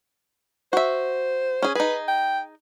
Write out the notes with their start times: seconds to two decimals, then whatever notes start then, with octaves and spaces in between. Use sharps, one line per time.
0.73 F#4 C5 E5
1.62 C#4 G#4
1.75 D#4 G#4 B4
2.08 G5